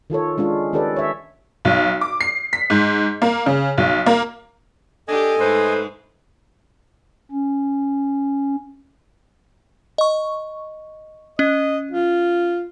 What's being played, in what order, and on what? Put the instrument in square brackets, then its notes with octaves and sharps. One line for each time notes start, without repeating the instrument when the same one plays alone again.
[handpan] D#3 F4 A4 C#5
G#3 C#4 D4 F4
D#3 C#4 G4 A4 B4 D5
C#5 E5
[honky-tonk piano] B1
D6
C7
B6
G#2
A#3
C#3
B1
A#3
[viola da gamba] D4 G4 [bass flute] A4 [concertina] D#5 G#5
[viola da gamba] G#2 G#3 [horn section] A3 B4 C5
[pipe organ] C#4
[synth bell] D#5 C#6
[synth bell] C#4 [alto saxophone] D#5
[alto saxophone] F4